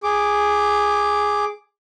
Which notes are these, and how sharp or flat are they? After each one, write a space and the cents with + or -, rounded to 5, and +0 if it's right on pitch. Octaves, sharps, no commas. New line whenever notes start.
G#4 -5 D6 +0